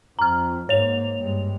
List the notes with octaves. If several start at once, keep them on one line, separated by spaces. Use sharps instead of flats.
F2 A#5 F6
G#2 A#3 C#5 F7
G2 G#3